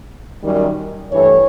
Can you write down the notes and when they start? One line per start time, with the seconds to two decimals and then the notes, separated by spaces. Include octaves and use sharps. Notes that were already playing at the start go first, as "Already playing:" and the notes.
0.44 F#2 D#3 G3
1.12 G2 E3 A3 C#5